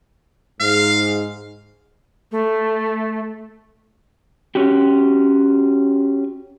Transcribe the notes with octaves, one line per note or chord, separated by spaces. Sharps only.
G#2 F5
A3
C#4 F#4 G4